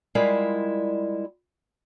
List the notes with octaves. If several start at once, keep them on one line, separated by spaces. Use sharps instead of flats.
G3 G#3 E4 F4 A#4 F5